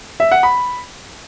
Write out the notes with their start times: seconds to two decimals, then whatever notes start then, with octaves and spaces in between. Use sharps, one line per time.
0.20 E5
0.32 F#5
0.43 B5